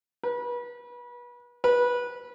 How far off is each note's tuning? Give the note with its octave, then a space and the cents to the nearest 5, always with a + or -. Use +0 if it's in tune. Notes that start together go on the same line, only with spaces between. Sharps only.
B4 -30
B4 -20